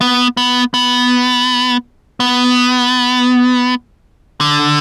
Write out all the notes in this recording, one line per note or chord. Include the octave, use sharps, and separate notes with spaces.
B3
B3
B3
B3
D3